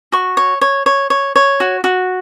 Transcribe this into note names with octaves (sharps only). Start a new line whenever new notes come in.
F#4 C#6
C#5
C#5
C#5
C#5
C#5
F#4
F#4